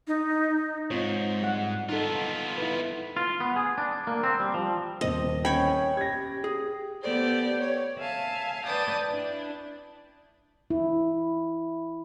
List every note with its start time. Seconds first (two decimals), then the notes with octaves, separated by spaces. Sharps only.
0.07 D#4
0.91 G#2 C4 F4 C#5
1.42 G3 F#5
1.89 B3 D#4 F4 A4
2.58 E4 B4
3.17 F4
3.40 B3
3.56 G#4
3.78 D4
4.07 A#3
4.23 C4
4.40 G3
4.54 F3
5.01 D#1 C4 D#5
5.45 C#4 C#5 G5 B5
5.97 G4 G#6 A#6
6.44 G#4
7.01 B3 G4 A4 C5 D5
7.60 C#5
7.98 E5 F5 G#5 A5
8.65 B4 D5 G5 A5 D#6
9.08 D4 E4
10.70 E4